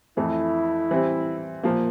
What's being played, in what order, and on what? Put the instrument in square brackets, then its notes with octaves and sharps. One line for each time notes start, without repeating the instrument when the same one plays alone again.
[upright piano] F2 E3 A3 [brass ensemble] E4
[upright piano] E3 G3 C4
A#2 F3 A#3